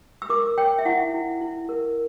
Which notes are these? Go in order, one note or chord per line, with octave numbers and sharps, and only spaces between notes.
E6
A#4 D6
C#5 G5
E5
E4 F#5
E4
E4
A#4